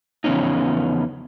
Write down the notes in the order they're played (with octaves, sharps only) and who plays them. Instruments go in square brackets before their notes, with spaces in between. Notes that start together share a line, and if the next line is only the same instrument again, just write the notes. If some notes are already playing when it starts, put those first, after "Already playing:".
[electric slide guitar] E2 C#3 F3 B3 C#4 D#4